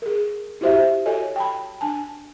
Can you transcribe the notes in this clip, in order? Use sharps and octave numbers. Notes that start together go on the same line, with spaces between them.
G#4 A#4
E4 F#4 G4 C5 D#5 E5
F#4 A4 C#5 D#5 G#5
G5 A5 B5
D4 G#5 A5